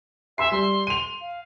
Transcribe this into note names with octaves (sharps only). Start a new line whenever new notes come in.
E5 G#5 C6 C7
G3 C6
D#7 F7
F5